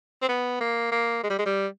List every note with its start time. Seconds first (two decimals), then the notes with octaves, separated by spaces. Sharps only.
0.22 C4
0.29 B3
0.60 A#3
0.92 A#3
1.23 G#3
1.30 G3
1.39 G#3
1.46 G3